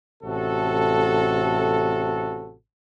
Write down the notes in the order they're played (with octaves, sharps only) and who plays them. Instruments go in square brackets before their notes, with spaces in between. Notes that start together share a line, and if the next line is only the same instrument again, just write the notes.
[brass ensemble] A1 C3 F#4 A4